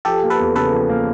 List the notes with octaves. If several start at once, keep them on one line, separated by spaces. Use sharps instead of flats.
F3 G4 A4
A#3
A4 B4
E2
C#3 A4 B4
F3
A#3